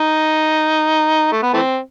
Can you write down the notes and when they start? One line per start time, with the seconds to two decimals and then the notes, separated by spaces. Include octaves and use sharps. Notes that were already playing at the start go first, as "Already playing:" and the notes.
Already playing: D#4
1.32 A3
1.42 B3
1.54 E3 A3 C4